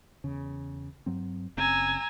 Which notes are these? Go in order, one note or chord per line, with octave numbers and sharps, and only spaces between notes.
E2 C#3
G2 F#3 C4
F#1 C#3 C4 G#5 A#5 E6